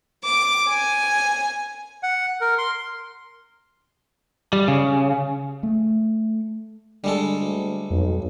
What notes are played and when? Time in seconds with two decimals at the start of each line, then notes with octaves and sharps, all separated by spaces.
0.25 D6
0.68 G#5
2.03 F#5
2.41 A#4
2.58 C6
4.53 G3
4.68 C#3
5.63 A3
7.04 D3 G3 G#3 A4
7.41 D2
7.90 B1 F2